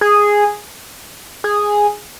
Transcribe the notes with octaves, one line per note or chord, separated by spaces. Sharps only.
G#4
G#4